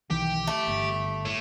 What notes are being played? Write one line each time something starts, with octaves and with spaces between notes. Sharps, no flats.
B1 D#3 E3 G4
A3
G1
A2